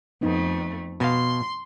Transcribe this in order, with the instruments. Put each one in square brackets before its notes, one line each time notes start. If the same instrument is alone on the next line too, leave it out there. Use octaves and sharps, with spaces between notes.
[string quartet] F2 A3 [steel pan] B3 D#4
[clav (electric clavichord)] B2 F5 [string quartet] C6